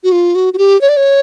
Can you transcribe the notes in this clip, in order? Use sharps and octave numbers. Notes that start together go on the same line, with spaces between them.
F#4
F4
F#4
F#4
G4
C#5
D5
C#5